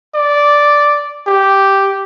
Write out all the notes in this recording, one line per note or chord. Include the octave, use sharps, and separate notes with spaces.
D5
G4